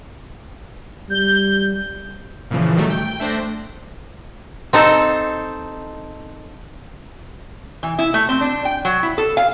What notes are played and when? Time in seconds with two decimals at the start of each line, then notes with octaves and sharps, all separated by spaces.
1.10 G3 G6
2.51 A#2 C#3 E3 F3
2.76 D#3 F#3 G3 A3
2.90 G5
3.20 A3 D4 C5 A#6
4.73 C4 D#4 A4 C5
7.83 E3
7.99 E4
8.14 A3
8.29 C4
8.41 D4
8.65 G5
8.85 F#3
9.03 E4
9.18 A4
9.37 F5